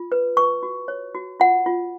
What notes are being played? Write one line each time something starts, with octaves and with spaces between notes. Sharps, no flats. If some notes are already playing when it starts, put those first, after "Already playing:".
Already playing: F4
B4
B4 C#6
F#4
C#5
F#4
F4 F#5
F4